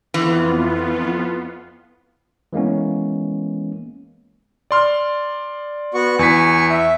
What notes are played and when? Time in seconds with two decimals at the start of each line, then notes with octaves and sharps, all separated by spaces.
0.14 F2 E3 B3 F4
2.53 E3 G#3 A#3 B3 C#4
4.71 D5 C6 F6
5.94 B3 F#4 C#6
6.19 E2 G#5 C#6 B6
6.70 E5